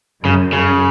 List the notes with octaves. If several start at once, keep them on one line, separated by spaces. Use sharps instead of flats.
F#2 C#3
C#3